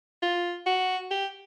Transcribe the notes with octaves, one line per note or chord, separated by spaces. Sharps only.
F4
F#4
G4